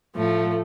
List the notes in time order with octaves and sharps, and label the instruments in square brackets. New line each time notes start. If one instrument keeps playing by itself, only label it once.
[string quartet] A2 F3 A3